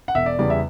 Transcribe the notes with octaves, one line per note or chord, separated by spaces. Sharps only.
F#5
E1 E5
D5
E2 C#3 G3 D5
E5